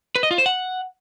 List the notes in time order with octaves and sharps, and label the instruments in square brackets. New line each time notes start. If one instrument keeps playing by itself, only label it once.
[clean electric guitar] B4
D#5
F4
C5
F#5